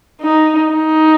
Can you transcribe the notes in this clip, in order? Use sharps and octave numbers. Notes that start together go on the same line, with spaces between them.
D#4
D#4